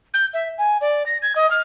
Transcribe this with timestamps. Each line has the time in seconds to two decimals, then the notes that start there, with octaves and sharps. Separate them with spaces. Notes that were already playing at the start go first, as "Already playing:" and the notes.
0.14 G6
0.33 E5
0.58 G#5
0.81 D5
1.06 A#6
1.22 G#6
1.35 D#5
1.50 F6